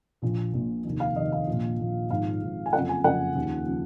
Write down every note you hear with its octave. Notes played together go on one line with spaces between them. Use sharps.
A#1 A#2 F3
A#1 A#2 F3
F1 D#2 D#3
F5
F1 D#2 D#3 D#5
F5
A#1 A#2 F3
A#1 A#2 F3
G#1 G#2 F3 F5
G#1 G#2 F3
G#5
F#1 F2 C#3 F3 F#5
G#5
F#1 F2 C#3 F3 F#5
D#2 C#3 F3
C#3 F3